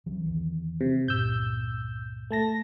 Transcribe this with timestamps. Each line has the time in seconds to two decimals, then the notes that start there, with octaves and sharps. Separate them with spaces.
0.06 C2 E3 F#3
0.26 E2 D#3 E3
0.81 C3
1.08 C#2 G2 A#2 E6 G6
2.31 A3 A5 A#6